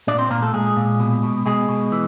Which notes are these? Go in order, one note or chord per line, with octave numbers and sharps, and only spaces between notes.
A#2 D4 D5
C4 C5
A#2 A#3 A#4
A3 A4
A#2 G#3 G#4
A#2
B2
B2
B2 G#3 G#4
B2
E3